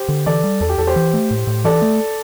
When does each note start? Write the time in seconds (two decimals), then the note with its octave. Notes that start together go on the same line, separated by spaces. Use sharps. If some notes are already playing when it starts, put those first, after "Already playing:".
Already playing: G4 C5
0.09 D3
0.26 E3 A4 D5
0.44 G3
0.61 E2 A4
0.69 G4
0.78 E2 A4
0.87 G4 C5
0.96 E3
1.14 A3
1.31 A2
1.47 A2
1.64 E3 A4 D5
1.82 A3